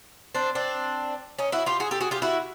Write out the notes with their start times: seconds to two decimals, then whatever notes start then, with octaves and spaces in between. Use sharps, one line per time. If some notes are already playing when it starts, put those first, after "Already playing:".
0.35 C4 D4
0.55 C4 D4
1.39 C#4 D#4
1.52 E4 F#4
1.66 F4 G4
1.80 F#4 G#4
1.91 G4 A4
2.01 F#4 G#4
2.11 F4 G4
2.22 E4 F#4